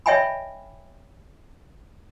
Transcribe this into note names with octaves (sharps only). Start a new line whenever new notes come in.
C#5 D#5 E5 G5 G#5 B5